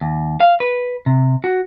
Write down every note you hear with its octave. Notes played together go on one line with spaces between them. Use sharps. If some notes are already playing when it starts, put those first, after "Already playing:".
D#2
F5
B4
C3
F#4